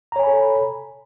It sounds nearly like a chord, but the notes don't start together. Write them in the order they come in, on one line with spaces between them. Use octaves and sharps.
A#5 C#5 G#5 B5 A4